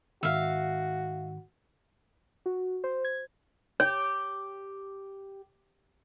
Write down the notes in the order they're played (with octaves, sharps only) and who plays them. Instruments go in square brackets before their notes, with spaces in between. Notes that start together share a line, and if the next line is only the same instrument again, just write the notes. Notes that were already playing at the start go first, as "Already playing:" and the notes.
[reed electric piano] G#2 D#3 [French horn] F#4 [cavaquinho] E5 F5
[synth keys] F#4
C5
G#6
[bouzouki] G4 [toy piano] C#5